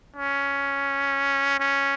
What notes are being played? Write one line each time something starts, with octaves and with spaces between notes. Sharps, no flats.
C#4
C#4